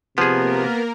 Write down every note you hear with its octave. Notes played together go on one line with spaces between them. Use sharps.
C3 F3 A#3 B3 G#4 A#4